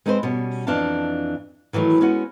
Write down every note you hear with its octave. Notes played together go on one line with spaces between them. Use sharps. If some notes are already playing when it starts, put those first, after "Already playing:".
G#3 C4 D#4 E4 B4 C5
B2 G3 C#4
F2 E3 D4 D#4 F5 A5
D#3 E3 F#3 A3
G#3 B3 C#4 F#4